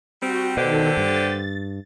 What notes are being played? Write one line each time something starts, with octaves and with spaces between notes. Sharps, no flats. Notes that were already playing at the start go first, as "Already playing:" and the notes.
G3 C4 F#4
B2 D3 D#3 G4 A4 C5
G2 A6